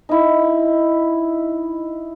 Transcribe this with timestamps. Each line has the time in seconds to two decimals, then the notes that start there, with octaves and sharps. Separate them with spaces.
0.09 D#4 E4